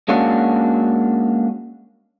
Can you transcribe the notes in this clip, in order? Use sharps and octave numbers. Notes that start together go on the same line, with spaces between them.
G#3 A#3 C#4 D4 F#4